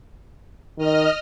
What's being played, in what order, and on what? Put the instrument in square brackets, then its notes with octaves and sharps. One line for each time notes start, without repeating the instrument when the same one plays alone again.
[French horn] D#3 [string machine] D#5 F6